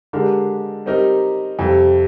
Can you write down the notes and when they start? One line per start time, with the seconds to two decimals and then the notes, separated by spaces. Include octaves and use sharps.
0.13 D3 G#3 D4 G4 A#4
0.86 G3 C4 D#4 G4 A#4
1.59 F2 C3 G3